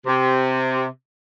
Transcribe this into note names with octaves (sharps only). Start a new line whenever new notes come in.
C3